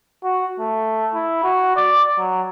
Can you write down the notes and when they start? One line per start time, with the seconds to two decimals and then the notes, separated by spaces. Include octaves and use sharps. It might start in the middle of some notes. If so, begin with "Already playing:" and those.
0.24 F#4
0.60 A3
1.14 E4
1.43 F#4
1.76 D5
2.18 F#3